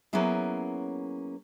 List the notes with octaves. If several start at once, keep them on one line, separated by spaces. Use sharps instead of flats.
F#3 A#3 B3 C#4 E4 G#4